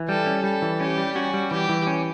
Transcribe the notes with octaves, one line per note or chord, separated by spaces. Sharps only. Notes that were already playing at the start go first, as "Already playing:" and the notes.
Already playing: E3
G3 A4
C#4
G3 A4
E3
C#4 G4
G3
C#4 F#4
G3
E3 G4
E3
C#4